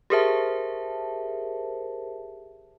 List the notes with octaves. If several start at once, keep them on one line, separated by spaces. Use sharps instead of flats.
G4 G#4 A#4 C5 E5 A5